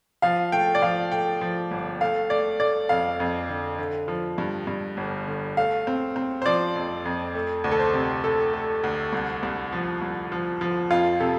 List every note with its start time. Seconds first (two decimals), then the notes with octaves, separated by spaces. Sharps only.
0.22 F3 F5
0.52 A3 G5
0.75 D5
0.82 F3 F5
1.12 A3 G5
1.41 F3
1.71 G1
2.01 A3 F5
2.30 A3 D5
2.60 A3 D5
2.89 F2 F5
3.20 F2
3.49 D3
3.78 D3
4.08 F3
4.38 G2
4.67 G2
4.97 G1
5.27 D3
5.57 A3 F5
5.87 C4
6.16 C4
6.42 C5
6.46 F3 D5
6.76 F2
7.05 F2
7.35 A3
7.64 D2
7.72 A4
7.79 C5
7.94 C3
8.24 A3 A4
8.53 A3
8.84 D2
9.13 C2
9.43 C2
9.73 F3
10.02 C2
10.32 F3
10.61 F3
10.90 F2 F4
11.20 C3 A4